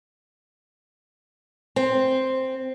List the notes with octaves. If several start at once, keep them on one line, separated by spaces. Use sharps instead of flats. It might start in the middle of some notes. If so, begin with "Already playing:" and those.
C4